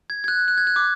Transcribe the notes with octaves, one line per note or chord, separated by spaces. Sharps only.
G#6
G#6
F#6
F#6
G#6
F#6
D6